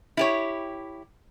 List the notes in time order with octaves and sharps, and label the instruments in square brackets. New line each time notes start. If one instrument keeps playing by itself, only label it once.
[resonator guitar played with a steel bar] E4 G4 C#5